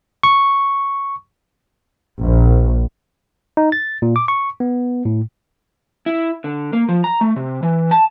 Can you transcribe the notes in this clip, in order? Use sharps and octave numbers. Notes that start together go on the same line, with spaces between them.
C#6
A#1
D#4
A6
A#2
D6
C#6
B3
A2
E4
D3
A#3
F3
A#5
A3
C3
E3
A5